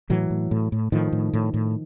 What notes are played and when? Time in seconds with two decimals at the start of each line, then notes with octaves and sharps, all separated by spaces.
0.10 A2 E3 F#3
0.30 A2
0.51 A2
0.72 A2
0.92 A2 D#3 F3
1.12 A2
1.33 A2
1.54 A2